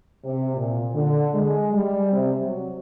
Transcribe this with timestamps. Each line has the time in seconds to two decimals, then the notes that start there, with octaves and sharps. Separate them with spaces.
0.23 C3
0.56 A#2
0.94 D3
1.34 G#3
1.72 G3
2.12 C3
2.42 F#3